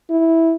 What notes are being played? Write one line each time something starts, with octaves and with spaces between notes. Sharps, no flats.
E4